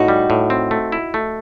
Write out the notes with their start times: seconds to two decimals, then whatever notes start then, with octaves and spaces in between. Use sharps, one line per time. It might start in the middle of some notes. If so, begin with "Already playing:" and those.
Already playing: A2 D#4 F#4
0.08 G3
0.30 A2
0.50 C4
0.71 A3
0.92 E4
1.14 A3